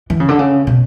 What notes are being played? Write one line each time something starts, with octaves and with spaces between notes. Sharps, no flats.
E3
C#3
D3
C#3
B2